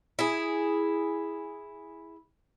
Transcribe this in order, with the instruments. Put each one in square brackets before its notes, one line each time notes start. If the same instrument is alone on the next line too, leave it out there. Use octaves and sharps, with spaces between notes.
[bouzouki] E4 G#4